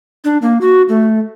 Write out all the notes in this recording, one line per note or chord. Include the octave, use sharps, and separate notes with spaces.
D4
A#3
F#4
A3